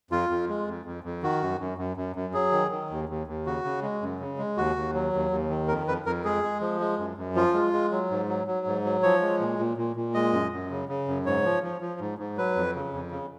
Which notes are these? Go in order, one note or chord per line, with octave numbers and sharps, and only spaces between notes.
F2 F4
F2
G#3
F2
F2
F2
D#3 F#4
F#2
F#2
F#2
F#2
F#2
F#3 G#4
D#3
D#3
D#2
D#2
D#2
C#3 F#4
C#3
G#3
F#2
C#3
G#3
D#2 F#4
D#2
F#3
D#2
D#2
D#3
F2 A#4
F2 B4
F2 A#4
G#3 G#4
G#3
F3
G#3
F#2
F#2
F3 F4
G#3
G#3
F#3
G#2
F#3
F#3
G#2
F#3
F3 C#5
G#3
A#2
A#2
A#2
A#2
G#3 D#5
F#2
F#2
C#3
C#3
F#2
G#2 C#5
F3
F3
F3
G#2
G#2
F#3 B4
F2
C#3
F2
C#3